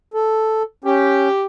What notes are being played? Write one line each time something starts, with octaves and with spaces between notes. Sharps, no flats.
A4
C#4 G4